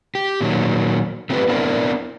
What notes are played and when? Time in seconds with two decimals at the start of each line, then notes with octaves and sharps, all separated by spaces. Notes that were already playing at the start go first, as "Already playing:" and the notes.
0.15 G4
0.41 A#2 D#3 F#3
1.30 A3 C4 F4 G4 G#4 B4
1.48 B3 C4 D4 E4 A#4